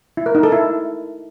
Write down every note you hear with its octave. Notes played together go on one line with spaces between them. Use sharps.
E4
A#4
D#4
A4
E4